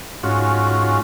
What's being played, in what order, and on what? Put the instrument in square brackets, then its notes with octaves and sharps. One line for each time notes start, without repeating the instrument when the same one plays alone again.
[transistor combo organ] G#2 C#4 F4 F#4